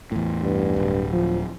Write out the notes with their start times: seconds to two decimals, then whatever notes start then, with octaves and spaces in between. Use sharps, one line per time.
0.12 E2 A2
0.42 G2
0.76 D1
1.12 F3